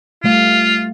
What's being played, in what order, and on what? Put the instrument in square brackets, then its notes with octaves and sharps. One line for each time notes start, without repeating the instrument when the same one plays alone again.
[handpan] G3 A3 F5 [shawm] F4